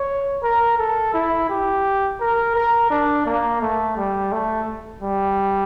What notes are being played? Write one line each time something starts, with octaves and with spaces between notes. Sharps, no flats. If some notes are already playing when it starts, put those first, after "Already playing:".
Already playing: C#5
A#4
A4
E4
G4
A#4
A#4
D4
A#3
A3
G3
A3
G3